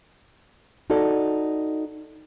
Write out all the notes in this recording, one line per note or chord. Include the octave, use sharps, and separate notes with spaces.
D#4 F#4 A4 D5